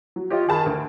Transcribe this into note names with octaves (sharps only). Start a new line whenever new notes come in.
F#3
F4 G4 C#5 D#5
D#3 G#4 A5 B5
D2